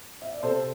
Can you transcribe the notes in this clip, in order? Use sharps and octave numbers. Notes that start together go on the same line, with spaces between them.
E5
D5
C3 A4 C5